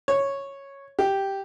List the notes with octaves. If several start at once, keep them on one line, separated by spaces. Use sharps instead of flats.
C#5
G4